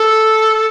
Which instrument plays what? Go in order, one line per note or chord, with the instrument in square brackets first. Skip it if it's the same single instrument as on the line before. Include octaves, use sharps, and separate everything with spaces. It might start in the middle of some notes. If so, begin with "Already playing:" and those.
Already playing: [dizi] A4